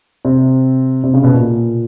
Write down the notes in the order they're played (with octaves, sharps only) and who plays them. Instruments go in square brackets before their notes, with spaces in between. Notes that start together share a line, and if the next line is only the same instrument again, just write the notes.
[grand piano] C3
C3
C#3
B2
A#2